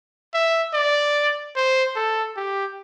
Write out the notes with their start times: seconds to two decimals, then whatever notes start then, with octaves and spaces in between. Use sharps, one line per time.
0.34 E5
0.74 D5
1.56 C5
1.96 A4
2.37 G4